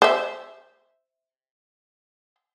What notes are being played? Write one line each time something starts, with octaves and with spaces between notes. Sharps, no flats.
C5 E5